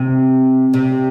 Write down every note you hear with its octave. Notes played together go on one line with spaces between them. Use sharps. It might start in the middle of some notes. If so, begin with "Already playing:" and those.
Already playing: C3
C3